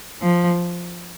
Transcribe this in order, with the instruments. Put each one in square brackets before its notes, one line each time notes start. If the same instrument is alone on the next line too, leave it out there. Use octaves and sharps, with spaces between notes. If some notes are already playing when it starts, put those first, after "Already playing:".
[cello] F3